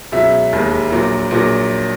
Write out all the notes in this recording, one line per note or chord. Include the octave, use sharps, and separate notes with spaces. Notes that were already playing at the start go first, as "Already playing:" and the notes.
C#2 B2 F#3 E5
E1 D#2 D#3 G#3
A#1 A#2 F#3
A#1 A#2 F#3